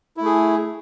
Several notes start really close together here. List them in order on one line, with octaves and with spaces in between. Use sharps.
E4 A3 G#4